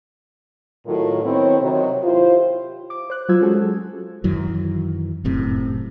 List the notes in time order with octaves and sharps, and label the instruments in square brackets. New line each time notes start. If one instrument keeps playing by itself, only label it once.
[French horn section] A2 D#3 F#3 F4 A4 A#4
D#3 B3 C4 E4 C#5
C3 D#3 F#3
E4 F4 G4 C5
[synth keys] D6
C5 F#6
F#3 F4 C5 E6 G#6
G#3 C#4 F#4 G#4 A4
[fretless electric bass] F#2 D#3 E3 F#3
F1 F#2 A2 C3